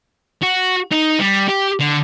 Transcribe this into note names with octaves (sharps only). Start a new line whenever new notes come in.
F#4
D#4
G3
G4
D3